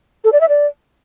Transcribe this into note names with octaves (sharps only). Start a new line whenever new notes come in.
A4
D5
E5
D5